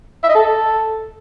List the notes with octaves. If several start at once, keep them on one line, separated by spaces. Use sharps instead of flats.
E5
D#5
A4